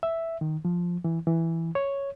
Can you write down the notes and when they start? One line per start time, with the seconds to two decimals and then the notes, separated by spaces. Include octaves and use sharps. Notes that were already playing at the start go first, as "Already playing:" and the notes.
0.03 E5
0.41 D#3
0.65 F3
1.04 E3
1.27 E3
1.75 C#5